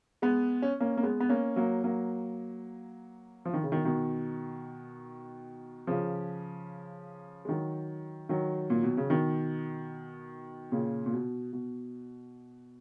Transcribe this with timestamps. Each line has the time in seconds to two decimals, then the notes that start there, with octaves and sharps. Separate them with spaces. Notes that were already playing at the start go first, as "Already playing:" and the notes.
0.22 G#3 B3
0.62 C#4
0.80 A#3 C#4
0.97 A#3
1.03 G#3 B3
1.20 B3
1.29 A#3 C#4
1.56 F#3 A#3
1.84 F#3 A#3
3.45 F3
3.54 D#3
3.63 C#3
3.72 B2 D#3
3.85 B2 D#3
5.87 C#3 F3
7.45 G#3
7.48 D#3 F#3
8.29 D#3 F#3
8.70 A#2
8.83 B2
8.97 C#3
9.10 B2 D#3
10.72 A#2 C#3
11.06 A#2
11.13 B2
11.53 B2